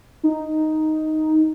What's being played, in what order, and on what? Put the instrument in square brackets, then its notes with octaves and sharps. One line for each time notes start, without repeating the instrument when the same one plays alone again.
[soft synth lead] D#4